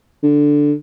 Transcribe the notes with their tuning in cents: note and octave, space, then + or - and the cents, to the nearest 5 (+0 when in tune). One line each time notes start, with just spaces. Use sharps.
D3 +0